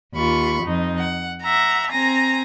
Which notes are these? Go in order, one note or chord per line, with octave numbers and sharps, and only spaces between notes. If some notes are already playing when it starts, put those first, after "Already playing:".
D#2 F4 B5 C#6
F2 D#4
F#5
E5 F#5 A#5
C4 G#5 A#5 A#6